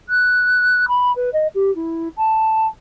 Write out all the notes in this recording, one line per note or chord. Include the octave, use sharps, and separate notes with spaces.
F#6
B5
B4
D#5
G4
E4
A5